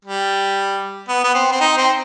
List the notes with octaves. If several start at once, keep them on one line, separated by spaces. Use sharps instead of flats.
G3
B3
B3
C4
C4
D#4
C4